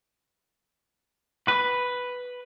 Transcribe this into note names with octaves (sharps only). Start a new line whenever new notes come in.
B4